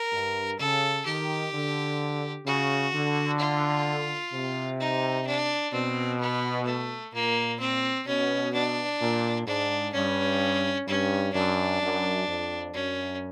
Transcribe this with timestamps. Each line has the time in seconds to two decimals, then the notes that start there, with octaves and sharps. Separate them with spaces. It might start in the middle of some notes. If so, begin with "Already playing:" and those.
Already playing: A#4
0.12 G2
0.59 C#3 A4
1.05 D#3 G4
1.53 D3
2.46 C#3 F#4
2.93 D3
3.40 F4
4.33 C3
4.80 D#4
5.27 D4
5.73 B2 C4
6.21 B3
6.66 A3
7.13 A#2 A#3
7.60 C4
8.07 B2 C#4
8.54 D4
9.01 A#2
9.47 G#2 D4
9.93 G2 C#4
10.87 G2 C#4
11.34 F#2 D4
11.81 F#2
12.27 F2
12.74 F#2 C#4